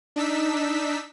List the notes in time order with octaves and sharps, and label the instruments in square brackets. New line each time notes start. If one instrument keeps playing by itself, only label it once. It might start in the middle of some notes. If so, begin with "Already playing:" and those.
[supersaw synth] D4 D#4 E6 B6